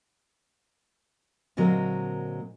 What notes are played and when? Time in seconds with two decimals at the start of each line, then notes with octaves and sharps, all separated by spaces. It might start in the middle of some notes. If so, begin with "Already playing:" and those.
1.57 A#2 D3 F#3 G#3 C4 A#4